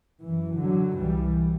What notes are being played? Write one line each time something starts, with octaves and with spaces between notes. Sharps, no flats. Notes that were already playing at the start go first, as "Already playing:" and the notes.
F#2 E3
D3 F#3
C2 B2 E3 G3